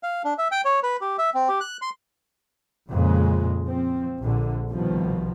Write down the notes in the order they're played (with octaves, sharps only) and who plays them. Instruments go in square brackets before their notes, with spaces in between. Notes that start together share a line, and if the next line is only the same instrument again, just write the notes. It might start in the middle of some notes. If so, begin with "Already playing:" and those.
[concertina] F5
D4
E5
G5
C#5
B4
G4
E5
C4
G4
F#6
C6
[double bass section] F2 A#2 C#3 G#3
F3 C4
A#1 D3
C2 B2 D#3 F3